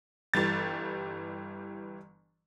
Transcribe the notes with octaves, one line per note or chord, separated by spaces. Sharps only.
G1 E3 G3 A6